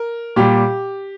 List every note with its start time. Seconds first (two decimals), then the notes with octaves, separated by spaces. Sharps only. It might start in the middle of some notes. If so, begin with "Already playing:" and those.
Already playing: A#4
0.36 A#2 G3 G4